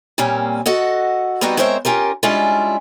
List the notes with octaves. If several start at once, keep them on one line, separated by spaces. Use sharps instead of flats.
A#2 G3 A#3 C4 C#4
F#4 A4 D#5 F#5
G3 B3 C4 D#4 F#4 D#5
G#3 C4 A#4 C5 C#5 E5
C#4 F4 G4 A#4
G3 G#3 C#4 D4 E4 F4